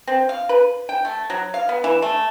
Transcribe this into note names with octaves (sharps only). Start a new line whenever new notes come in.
C4
F5
B4
G5
A3
F#3
F5
B3
E3
A3